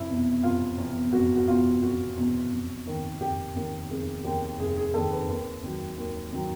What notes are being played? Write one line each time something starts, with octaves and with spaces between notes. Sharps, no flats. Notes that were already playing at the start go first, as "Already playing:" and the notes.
Already playing: F1 E4
E2 B2
F1 F4
E2 B2
F1 F#4
F#4
E2 B2 F4
F1 F#4
E2 B2
F1
D#2 D#3
F1 G4
D#2 D#3
F1 G#4
D#2 D#3 G4
F1 G#4
G#4
D#2 D#3 A4
B4
D#2
D#3 F#3
D#2
D#3 F#3